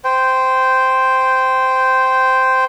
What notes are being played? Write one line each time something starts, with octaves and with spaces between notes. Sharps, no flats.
C5 G5